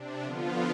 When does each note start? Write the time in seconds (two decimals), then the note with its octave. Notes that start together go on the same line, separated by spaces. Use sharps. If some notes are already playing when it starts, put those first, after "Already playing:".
Already playing: C3 D4
0.23 D3 F3 B3 F4